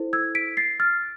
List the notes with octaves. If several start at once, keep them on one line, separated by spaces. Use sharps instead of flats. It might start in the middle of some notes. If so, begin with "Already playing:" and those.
Already playing: E4 A4 C5
E6 G#6
B6 D7
A6 C7
F6 A6